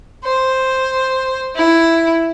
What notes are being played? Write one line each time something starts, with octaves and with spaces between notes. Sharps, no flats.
C5
E4